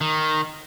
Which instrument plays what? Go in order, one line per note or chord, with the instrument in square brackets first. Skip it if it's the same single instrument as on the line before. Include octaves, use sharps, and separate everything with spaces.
[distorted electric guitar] D#3